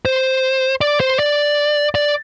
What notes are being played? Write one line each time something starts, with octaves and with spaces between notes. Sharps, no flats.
C5
D5
C5
D5
D5